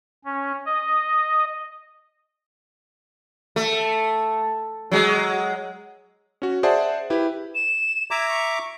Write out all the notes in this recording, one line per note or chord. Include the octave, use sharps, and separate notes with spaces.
C#4
D#5
A3
F#3 G#3
C#4 F#4
G#4 C5 D5 E5 F#5 A5
E4 G4 B4
E7
E5 A#5 D6 G#6
C#6